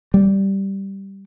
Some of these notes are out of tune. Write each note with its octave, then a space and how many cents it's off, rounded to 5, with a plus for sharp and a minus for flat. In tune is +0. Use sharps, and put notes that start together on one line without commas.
G3 -5